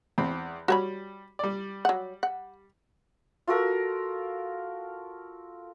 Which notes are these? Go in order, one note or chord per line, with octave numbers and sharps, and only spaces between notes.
E2 C4 B5
G3 F#4 C#5 B5
G3 D5
F#3 F#5
F#5
F4 F#4 A4 A#4